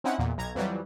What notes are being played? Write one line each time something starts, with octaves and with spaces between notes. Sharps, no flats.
C4 C#4 D#4 E4 F#5
E2 A#2
B1 A#5 G#6
F2 E3 F#3 G3